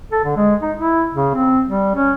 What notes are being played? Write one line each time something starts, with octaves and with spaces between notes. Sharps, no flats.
A4
D3
G#3
D#4
E4
C#3
C4
G3
C#4